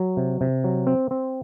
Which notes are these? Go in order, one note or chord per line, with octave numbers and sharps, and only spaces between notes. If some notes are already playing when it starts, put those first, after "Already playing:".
Already playing: F#3
C3
C3
F#3
C4
C4